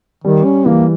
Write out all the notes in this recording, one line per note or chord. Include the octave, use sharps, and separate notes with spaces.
D#3 G3
C#4
E3 A#3